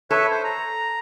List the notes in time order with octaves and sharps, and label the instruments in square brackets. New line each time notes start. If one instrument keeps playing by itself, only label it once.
[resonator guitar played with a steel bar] A4 [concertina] B4 C#5 E5
[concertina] C5
A#5